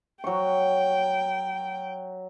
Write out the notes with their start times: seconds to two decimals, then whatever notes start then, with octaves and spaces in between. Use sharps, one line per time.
0.24 F#3 G5 C#6